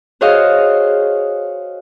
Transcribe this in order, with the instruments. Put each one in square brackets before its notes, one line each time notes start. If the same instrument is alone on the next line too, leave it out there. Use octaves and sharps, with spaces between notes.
[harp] F#4 G#4 C5 C#5 D#5 F5